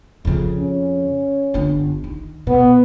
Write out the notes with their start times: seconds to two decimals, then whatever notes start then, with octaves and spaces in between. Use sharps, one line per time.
0.25 F2 C#3
0.60 C#4
1.54 G1 D4
2.04 D#3
2.47 B2 B3